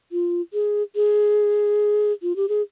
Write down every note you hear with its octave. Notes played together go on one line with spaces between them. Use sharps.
F4
G#4
G#4
F4
G4
G#4